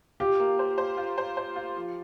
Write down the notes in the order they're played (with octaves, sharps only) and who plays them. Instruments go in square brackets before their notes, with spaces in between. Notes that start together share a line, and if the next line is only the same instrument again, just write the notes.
[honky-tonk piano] F4 [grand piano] G4
[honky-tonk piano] A#3
C5
C5
F4
C5
C5
F4
F3